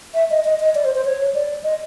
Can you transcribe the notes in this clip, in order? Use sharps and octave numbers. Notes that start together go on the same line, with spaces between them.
E5
D#5
D#5
D#5
D5
C5
C5
C#5
D5
D#5